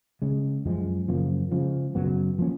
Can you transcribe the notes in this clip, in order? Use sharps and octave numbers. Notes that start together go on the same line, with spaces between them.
C#3 G#3 C#4
F#2 F3 G#3
F#2 C#3 F3 A#3
C#3 F3 G#3
F#2 C#3 F#3 B3
F3 A#3 C#4